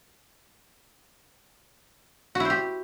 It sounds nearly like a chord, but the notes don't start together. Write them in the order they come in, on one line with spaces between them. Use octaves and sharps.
F#4 E4 C5 G4